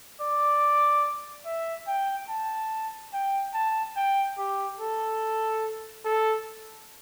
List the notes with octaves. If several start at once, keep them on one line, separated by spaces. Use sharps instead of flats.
D5
E5
G5
A5
G5
A5
G5
G4
A4
A4